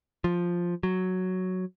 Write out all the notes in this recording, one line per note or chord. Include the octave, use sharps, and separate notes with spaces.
F3
F#3